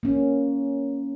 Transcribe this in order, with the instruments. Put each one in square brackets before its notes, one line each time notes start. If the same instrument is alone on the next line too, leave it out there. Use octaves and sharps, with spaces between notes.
[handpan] A#3 C#4